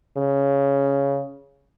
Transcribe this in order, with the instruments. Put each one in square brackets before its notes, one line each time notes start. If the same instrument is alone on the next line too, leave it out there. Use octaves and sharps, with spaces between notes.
[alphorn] C#3